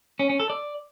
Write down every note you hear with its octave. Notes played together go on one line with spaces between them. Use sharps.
C#4
C#4
A4
D5